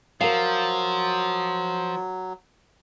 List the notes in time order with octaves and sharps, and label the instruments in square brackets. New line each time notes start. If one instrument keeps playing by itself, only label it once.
[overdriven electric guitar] F3 [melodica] F#3 [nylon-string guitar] A#4 F5